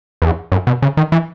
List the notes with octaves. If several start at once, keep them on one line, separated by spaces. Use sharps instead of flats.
E2
F#2
B2
C#3
D#3
E3